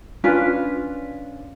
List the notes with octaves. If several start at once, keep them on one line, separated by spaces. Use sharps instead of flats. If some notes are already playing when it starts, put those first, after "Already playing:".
C#4 D4 F4 B4